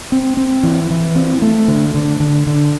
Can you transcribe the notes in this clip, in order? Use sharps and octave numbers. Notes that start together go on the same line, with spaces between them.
C4
C4
E3
E3
C4
A3
D3
D3
D3
D3